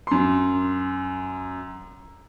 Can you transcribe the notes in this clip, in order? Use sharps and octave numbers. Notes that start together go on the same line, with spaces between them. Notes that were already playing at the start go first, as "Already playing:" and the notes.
F#2 C6